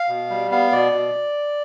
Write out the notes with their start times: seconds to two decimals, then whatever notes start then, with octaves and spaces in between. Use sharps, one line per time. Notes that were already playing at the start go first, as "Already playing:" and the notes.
Already playing: F5
0.08 B2
0.30 G3
0.51 B3 F5
0.72 B2 D5
0.93 B2